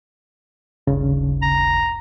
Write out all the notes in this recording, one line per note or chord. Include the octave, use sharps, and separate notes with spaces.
D#1 G#1 G2 C#3
A#5